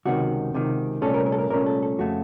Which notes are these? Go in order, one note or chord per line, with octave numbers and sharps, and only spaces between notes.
C#2 C3 D#3 F#4
C#2 C3 D#3
C2 A#2 A3 C#4 A4
A#4
A#4
A4
A#4
C2 A#2 A3 C#4 A#4
A4
A4
F2 C#3 A3 F#4